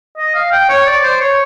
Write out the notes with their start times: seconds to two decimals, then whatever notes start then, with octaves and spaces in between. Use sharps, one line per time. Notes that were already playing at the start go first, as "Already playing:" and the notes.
0.18 D#5
0.35 F5
0.52 G5
0.69 C#5
0.86 D5
1.03 C5
1.21 C#5